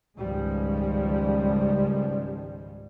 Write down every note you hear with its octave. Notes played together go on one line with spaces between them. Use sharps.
C#2 G#2 D#3 F3 G3 G#3